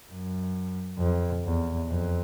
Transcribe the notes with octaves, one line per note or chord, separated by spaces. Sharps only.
F#2
F2
E2
F2